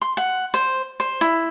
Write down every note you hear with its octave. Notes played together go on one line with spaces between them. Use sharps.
C6
F#5
C5
C5
E4